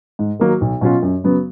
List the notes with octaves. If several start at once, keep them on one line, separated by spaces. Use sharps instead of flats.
G#2
D#3 F#3 A#3
B1
B2 F#3 C#4 F4
F#2
C#3 F#3 B3